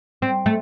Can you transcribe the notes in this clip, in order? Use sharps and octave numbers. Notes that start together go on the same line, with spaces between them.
C4
A3